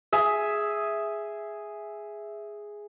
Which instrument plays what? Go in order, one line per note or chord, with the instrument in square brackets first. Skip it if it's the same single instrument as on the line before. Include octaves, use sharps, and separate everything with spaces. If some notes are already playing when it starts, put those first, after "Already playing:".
[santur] G#4 E5